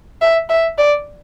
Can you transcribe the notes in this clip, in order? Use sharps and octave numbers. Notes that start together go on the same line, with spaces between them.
E5
E5
D5